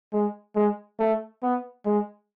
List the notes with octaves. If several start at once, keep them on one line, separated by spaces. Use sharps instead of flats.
G#3
G#3
A3
B3
G#3